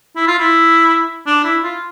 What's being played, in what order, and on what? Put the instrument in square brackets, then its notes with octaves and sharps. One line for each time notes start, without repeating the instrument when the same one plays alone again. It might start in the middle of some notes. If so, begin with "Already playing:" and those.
[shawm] E4
F4
E4
D4
E4
F4